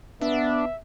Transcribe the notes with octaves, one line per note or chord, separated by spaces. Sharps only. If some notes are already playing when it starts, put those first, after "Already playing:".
B3 D4 E5